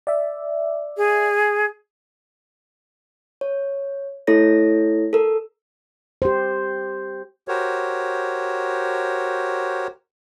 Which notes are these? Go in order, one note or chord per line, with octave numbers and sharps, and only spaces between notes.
D5 E5
G#4
C#5
A3 E4 A4 C#5 A#6
A4 A#4
G4 C5
F#4 G4 A#4 C5 C#5